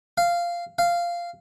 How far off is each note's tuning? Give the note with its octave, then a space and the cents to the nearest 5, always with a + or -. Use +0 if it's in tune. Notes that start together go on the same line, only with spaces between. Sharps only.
F5 -10
F5 -10